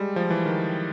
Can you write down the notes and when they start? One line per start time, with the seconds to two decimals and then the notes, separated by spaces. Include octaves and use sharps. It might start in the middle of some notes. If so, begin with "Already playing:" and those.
Already playing: G3 G#3
0.16 F3
0.30 E3
0.46 D#3